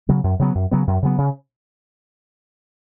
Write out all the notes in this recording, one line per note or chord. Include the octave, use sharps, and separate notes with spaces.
C#3 F#3 B3
F#2
C#3 F#3 B3
F#2
C#3 F#3 B3
F#2
C#3 F#3 B3
C#3